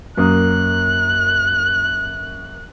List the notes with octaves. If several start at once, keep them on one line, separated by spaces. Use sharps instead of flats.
F#2 A#3 D#6 F#6